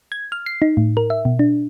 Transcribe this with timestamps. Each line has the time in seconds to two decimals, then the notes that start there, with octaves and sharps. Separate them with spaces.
0.12 G#6
0.32 F6
0.46 C7
0.62 D#4
0.77 A2
0.97 A#4
1.10 E5
1.25 B2
1.39 D4